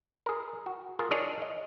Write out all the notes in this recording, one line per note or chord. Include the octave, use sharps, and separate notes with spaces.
G#4 A#4
F#4
F4 G#4 A#4
D4 D#4 G#4 A#4 C#5 D5
D#5